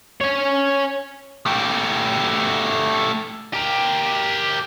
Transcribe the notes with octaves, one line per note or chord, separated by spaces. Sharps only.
C#4 C#5
A3 G4
G4 A#4